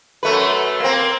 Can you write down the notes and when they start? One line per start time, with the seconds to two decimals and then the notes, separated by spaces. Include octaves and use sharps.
0.23 F#2 A3 B4
0.80 A#3 C4